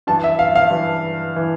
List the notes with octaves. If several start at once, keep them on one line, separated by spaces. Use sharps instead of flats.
G2 E3 A5
E5
F5
F5
G2 E3
E3